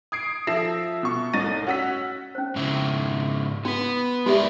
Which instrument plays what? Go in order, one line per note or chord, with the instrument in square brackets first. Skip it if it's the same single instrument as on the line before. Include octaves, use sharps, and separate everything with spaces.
[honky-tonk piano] D#6 G#6 C7 D7
F3 A4 E5 A#6 C7 E7
B2 C#6
C2 A2 D#4 A6 A#6 D#7
C#4 F#4 F#5 E6 B6
[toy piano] C#4 C5
[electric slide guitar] G#2 C#3 E4
[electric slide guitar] B3 B4 [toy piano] D4 F#4
[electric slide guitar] G#3 A#4 D5 [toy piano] F#4 G4 E5